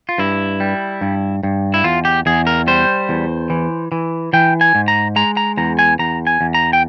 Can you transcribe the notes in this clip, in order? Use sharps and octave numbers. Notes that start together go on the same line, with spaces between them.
F4
G2 E4
G3
G2
G2
E4
E2 F4
G4
E2 G#4
A#4
G3 C5
E2
E3
E3
E3 G5
G#5
G#2
A#5
G#3 A#5
A#5
E2 A#5
G#5
E2 A#5
G#5
E2
A#5
G5